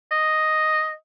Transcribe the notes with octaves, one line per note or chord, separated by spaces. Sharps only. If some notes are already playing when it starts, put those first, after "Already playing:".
D#5